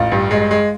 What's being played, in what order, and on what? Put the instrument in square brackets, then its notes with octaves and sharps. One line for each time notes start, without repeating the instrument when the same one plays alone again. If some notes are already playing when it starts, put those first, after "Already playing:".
Already playing: [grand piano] A1 F4
G2
G#3
G#3